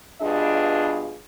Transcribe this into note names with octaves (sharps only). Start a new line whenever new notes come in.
G2 B2 D4 F4 G#4 D#5